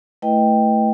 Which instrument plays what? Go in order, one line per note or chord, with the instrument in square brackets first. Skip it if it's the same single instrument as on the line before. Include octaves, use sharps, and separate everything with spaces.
[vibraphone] A3 E4 B4 D#5 G5